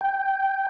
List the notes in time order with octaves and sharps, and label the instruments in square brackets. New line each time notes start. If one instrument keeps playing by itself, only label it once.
[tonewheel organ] G5